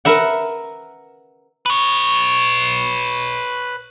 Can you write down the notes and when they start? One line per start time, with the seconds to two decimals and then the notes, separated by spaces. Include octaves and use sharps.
0.05 A#4 B4 E5 F#5
1.66 B4 C#5